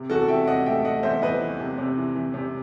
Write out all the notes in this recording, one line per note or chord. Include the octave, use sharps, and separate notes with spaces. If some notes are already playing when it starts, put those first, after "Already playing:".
Already playing: C3
E2 F#4 A4
E3 E5 G5
C3 D#5 F#5
A3 E5 G5
A3 D#5 F#5
E2 C5 E5
E2 B4 D#5
E3
C3
C3
E3
E3
C3